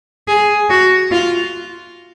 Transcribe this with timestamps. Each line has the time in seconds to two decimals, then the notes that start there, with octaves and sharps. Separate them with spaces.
0.27 G#4
0.70 F#4
1.11 F4